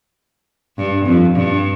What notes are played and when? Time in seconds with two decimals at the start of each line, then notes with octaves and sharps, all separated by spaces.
0.77 G2
1.06 F2
1.35 G2